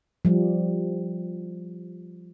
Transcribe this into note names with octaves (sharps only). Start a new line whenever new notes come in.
F3 G3